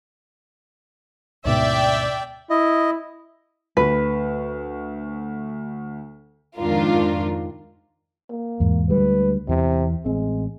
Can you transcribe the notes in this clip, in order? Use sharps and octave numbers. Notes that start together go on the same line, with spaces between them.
D2 G#2 B2 D5 E5 G5
E4 D#5
D2 B4
F2 G#2 D#3 D4 F4 A#4
A#3
E2 G#2
D2 G3 G#3 B4
E2 C3 E3
A1 G#3 C4